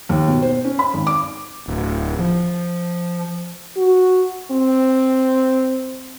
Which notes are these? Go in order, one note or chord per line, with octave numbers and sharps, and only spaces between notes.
D#2
B2
C5
C#4
B5
G#1
D6
D1
F3
F#4
C4